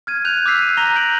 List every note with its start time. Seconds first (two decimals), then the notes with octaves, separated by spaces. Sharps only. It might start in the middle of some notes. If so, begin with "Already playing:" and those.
0.07 F6 G#6 D#7
0.25 F#6 G6 F7
0.46 D6 E6 F6 B6 C7
0.62 D#7
0.77 A#5 A#6 F7 G7
0.95 G6 A#6 D7 F#7